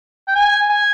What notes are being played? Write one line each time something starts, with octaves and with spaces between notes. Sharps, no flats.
G5
G#5
G#5